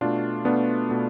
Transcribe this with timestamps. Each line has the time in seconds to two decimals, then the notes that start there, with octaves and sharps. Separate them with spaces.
0.01 B2 A3 D4 F4
0.45 B2 A3 B3 D4
0.89 B2 A3